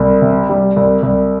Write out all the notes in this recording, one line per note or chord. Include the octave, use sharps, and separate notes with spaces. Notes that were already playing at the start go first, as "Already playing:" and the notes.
Already playing: C2
C3
G3
C2
C2